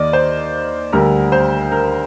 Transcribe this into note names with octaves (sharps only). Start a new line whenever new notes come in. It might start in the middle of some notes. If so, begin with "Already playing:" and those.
Already playing: D#2 D#3 A#3 D5 D#5
C5
D2 D3 G3 A#4
C5
A#4